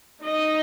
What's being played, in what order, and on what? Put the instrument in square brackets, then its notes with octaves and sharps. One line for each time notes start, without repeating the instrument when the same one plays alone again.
[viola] D#4 [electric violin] D#5